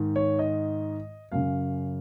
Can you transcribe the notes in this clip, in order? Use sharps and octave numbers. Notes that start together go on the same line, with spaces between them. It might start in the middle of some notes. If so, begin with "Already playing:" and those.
Already playing: G#2 D#3
C#5
D#5
F#2 C#3 F5